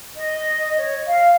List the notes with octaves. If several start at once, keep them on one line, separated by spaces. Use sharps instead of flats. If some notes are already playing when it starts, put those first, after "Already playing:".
D#5
C#5
F5